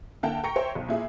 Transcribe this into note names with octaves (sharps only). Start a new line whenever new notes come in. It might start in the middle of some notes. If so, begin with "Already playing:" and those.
D3 A#3 E4 F#5 G5 A5
G5 A#5 C#6 A#6 C#7
C5 C#5 E5 G5
B1
A#2 E4 G#4 E5